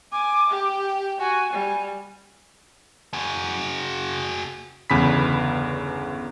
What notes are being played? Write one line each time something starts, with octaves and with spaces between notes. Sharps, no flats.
G#5 D6
G4
F#4 G#5
G3
F#4 G#4
G1 E2 C#3 B5 B6